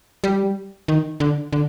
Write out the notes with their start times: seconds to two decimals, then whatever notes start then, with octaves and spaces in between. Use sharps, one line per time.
0.24 G3
0.88 D#3
1.20 D3
1.53 D3